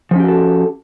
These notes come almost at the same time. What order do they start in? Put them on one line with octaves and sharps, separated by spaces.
F3 C#4 G4 F#4 A4